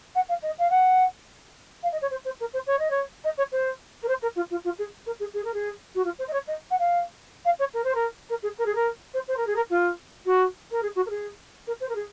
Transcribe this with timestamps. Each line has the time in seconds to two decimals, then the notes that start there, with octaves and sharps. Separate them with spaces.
0.15 F#5
0.28 F5
0.42 D#5
0.58 F5
0.70 F#5
1.83 F5
1.92 D#5
2.01 C#5
2.10 C5
2.25 C5
2.40 A#4
2.53 C5
2.67 C#5
2.79 D#5
2.90 C#5
3.24 D#5
3.37 C#5
3.52 C5
4.02 A#4
4.08 C5
4.22 A#4
4.36 F4
4.50 F4
4.64 F4
4.78 G#4
5.06 A#4
5.19 G#4
5.33 G#4
5.44 A#4
5.53 G#4
5.95 F#4
6.04 F4
6.18 C5
6.28 D#5
6.33 C#5
6.47 D#5
6.70 F#5
6.79 F5
7.45 F5
7.59 C#5
7.73 A#4
7.84 C5
7.94 A#4
8.29 A#4
8.42 G#4
8.58 A#4
8.65 G#4
8.75 A#4
9.14 C5
9.28 C5
9.36 A#4
9.46 G#4
9.55 A#4
9.70 F4
10.25 F#4
10.71 A#4
10.82 G#4
10.95 F#4
11.05 A#4
11.09 G#4
11.66 A#4
11.80 C5
11.88 A#4
11.95 G#4